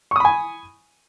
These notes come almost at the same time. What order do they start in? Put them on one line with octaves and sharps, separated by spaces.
C#6 D#6 B5 G#5